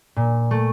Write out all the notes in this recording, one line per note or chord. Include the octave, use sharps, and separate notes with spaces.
A#2
A3